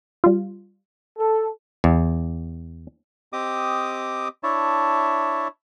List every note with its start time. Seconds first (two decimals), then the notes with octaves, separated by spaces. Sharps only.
0.24 G3 F4
1.17 A4
1.84 E2
3.33 C4 G4 D#5 D6 D#6
4.43 D4 E4 C#5 E5 A5